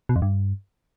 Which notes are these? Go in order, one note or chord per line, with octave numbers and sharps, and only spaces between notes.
B2
F2
G2